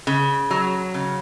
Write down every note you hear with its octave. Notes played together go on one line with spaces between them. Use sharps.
C#3
F#3
C#3